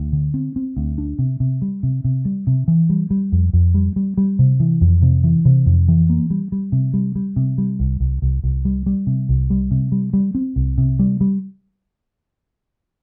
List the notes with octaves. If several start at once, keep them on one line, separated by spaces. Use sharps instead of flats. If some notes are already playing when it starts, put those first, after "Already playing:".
Already playing: D2
D3
C4
C4
D2
D4
C3
C3
G3
C3
C3
G3
C3
E3
G3
G3
F2
F2
G3
G3
G3
C3
E3
F2
C3
E3
C3
F2
E3
A#3
G3
G3
C3
G3
G3
C3
G3
C2
C2
C2
C2
G3
G3
C3
C2
G3
C3
G3
G3
C4
C2
C3
G3
G3